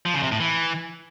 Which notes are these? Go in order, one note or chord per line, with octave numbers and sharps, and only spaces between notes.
F3
C#3
C3
A2
E3